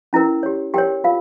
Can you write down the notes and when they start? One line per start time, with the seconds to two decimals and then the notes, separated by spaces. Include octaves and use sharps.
0.13 C#4 E4 A#4
0.43 G4 C#5
0.74 G4 A#4 C#5 G5
1.04 F4 A#4 F5